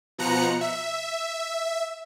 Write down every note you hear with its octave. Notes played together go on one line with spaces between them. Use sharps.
B2 F3 A#5 F#6 C#7
E5